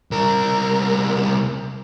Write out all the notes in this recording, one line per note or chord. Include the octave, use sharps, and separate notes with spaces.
C2 A#4